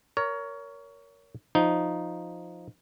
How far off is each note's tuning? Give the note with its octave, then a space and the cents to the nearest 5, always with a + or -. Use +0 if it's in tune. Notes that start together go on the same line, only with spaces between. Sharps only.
A#4 +0 C#5 +25
F3 +0 D#4 +0